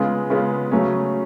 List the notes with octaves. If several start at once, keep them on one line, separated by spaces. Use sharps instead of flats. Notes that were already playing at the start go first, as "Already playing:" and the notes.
Already playing: C#3 G#3 B3 F4
C#3 G#3 B3 F4
C#3 F#3 A3 C#4